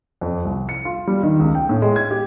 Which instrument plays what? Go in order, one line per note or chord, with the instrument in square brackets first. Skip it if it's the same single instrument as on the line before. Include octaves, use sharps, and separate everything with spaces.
[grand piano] F2
C2
C#7
F4
G3
D#3
C#2
G5
A2
G#3
G#6
G4